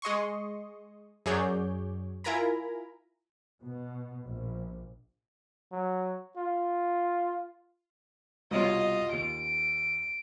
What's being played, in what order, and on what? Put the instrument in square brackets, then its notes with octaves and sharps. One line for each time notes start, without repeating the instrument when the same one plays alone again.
[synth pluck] G#3 D#5 C6 C#6
F#2 F#3 G#4 C#5 D5 G6
E4 F4 A#4 G#5 A#5 B5
[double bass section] B2
A#1
[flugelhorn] F#3
F4
[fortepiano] C2 B2 C#5 [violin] F4 D#5
[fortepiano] D#2 [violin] D7